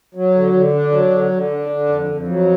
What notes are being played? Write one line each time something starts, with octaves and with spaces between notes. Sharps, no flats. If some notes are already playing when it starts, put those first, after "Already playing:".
F#3
D3
D3
D4
F#3
D3
D3
D4
D3
F2
F2
F#3